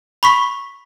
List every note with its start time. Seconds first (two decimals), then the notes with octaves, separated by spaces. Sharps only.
0.23 B5 C#6 B6